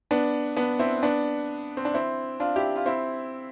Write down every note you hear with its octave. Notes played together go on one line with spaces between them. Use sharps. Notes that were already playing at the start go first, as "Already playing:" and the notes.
B3 D4
B3 D4
C4 E4
B3 D4
C4
D4
C4 E4
D4 F4
E4 G4
F4
C4 E4